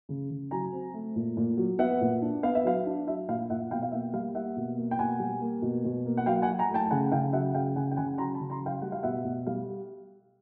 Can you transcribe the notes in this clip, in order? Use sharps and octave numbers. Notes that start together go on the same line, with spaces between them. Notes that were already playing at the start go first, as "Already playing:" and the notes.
C#3
C#3
F#3 G#5 A#5
C4
A3
A#2
A#2
F#3
B3 E5 F#5
A#2
D4
B3 F5
E5
F#3 F5
D4
F#3 E5
A#2 F5
A#2 E5 F#5
B2 F5 G5
F5
A#3 E5 F#5
G3 F5
A#3 E5 F#5
B2
A#3
G5
B2 F#5 G#5
G3
A#3
B2
B2
A#3
F#5
F#3 F5 G5
F#5 G#5
F#3
G#5 A#5
A3
G5 A5
A5
C#3 F#5 G#5
C#3 F5 G5
F#3 E5 F#5
C#3 F5 G5
C#3 F#5 G#5
G5
C#3 F#5 G#5
F#3 A#5 C6
A5 B5
C#3
A#5 C6
F#3
F5 G5
G3 F#5
F5
B2 E5 F#5
B2
G3 F5